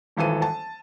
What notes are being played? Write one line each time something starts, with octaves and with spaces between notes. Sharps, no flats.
D#1 G#1 E3 A4 D#7
A5